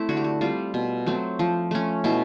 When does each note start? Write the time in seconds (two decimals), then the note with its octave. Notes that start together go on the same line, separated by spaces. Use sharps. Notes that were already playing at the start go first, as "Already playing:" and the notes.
Already playing: A3 C4 E4
0.09 D3 F#4
0.17 G4
0.24 F#4
0.41 G3 C4 F4
0.74 B2
1.06 F#3 A3 C4
1.39 F3
1.71 A3 C#4
2.04 B2 E4